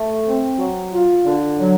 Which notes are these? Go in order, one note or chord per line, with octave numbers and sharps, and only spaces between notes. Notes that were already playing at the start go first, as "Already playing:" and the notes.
Already playing: A3
C4
F#3
F4
D3
F#3